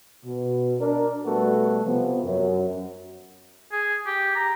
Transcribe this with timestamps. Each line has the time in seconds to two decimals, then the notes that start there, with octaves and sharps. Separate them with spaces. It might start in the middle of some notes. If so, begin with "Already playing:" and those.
0.24 B2
0.79 D4 A#4
1.26 B2 G3 A3 F#4 A4 B4
1.85 C3 F3 B3
2.24 F#2
3.72 G#4
4.07 G4
4.36 A#5